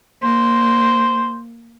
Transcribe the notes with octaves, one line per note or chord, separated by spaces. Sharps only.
A#3 C5